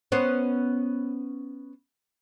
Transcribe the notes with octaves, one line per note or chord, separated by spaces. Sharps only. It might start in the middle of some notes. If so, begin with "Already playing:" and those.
B3 C#4 C5